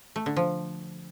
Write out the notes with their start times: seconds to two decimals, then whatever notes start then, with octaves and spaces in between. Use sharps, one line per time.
0.16 A3
0.26 D3
0.36 F3